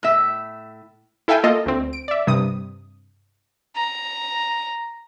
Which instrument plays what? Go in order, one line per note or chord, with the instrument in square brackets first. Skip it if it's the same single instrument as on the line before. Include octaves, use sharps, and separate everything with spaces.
[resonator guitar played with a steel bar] A2 E5
[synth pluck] E4 A4 E5 F5 G5 G#5
A#3 F4 A4 D#5
D2 C4
D7
D5 E5
G2 C3 D#6
[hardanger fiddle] A#5